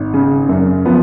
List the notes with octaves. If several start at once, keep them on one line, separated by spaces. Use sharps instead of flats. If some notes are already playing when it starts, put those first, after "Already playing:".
Already playing: G#1
C#3
F#2
F3 B3